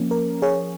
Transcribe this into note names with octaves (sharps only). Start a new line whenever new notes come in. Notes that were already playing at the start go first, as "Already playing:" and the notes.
Already playing: F3 A#3 C#4
A#4
G#4 C#5